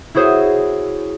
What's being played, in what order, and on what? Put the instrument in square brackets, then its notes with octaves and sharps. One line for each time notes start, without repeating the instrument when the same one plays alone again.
[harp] E4 F#4 G#4 C5 C#5